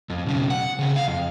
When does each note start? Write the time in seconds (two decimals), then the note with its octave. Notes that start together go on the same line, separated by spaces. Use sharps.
0.10 F2
0.26 B1 C#3
0.50 F#5
0.79 C#3 C4
0.96 F5
1.08 F2